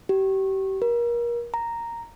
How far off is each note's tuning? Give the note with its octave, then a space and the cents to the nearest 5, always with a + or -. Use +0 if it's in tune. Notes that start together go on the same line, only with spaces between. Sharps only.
G4 -30
A#4 +30
A#5 -5